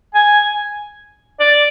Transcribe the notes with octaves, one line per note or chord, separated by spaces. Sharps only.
G#5
D5